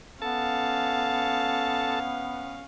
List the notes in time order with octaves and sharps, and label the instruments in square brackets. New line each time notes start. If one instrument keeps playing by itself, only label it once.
[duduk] B3 [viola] C#4 F5 [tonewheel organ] A4 A5